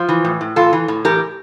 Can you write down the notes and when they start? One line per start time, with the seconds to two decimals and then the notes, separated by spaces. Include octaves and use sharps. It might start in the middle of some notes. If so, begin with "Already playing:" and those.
Already playing: F3
0.09 E3
0.25 A2
0.41 A2
0.56 E3 F4 A4
0.73 E3
0.88 A2
1.05 E3 G4 A#4